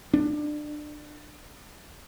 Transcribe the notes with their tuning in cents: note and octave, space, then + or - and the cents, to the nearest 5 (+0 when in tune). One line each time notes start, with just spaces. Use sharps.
D4 +25